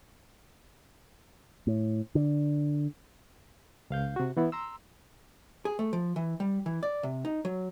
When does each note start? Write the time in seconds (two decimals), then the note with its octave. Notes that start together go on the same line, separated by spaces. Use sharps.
1.67 A2
2.15 D3
3.90 C#2 F5 G6
4.16 C3 F#4
4.37 E3 B3 E4
4.52 A#5 C6 E6
5.65 G#4
5.79 A3
5.93 F3
6.16 E3
6.40 G3
6.66 E3
6.83 D5
7.03 C3
7.25 D#4
7.45 F#3